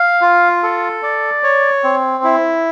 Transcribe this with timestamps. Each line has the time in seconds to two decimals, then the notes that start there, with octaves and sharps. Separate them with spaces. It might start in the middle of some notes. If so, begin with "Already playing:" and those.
Already playing: F5
0.21 F4
0.63 A4
1.03 D5
1.43 C#5
1.84 C4
2.24 E4